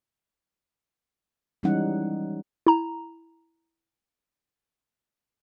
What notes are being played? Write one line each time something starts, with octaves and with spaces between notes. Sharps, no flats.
E3 G3 G#3 C#4 D#4 F#5
E4 A#5